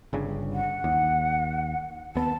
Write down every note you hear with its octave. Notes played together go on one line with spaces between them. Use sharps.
G1 G2 C#3
F#5
D#2
D#2 B3 A5